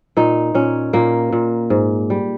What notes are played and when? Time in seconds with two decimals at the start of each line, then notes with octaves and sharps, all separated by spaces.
0.17 A#2 D#4
0.54 A#2 C#4
0.93 A#2 A#3
1.32 A#2
1.70 G#2
2.10 G3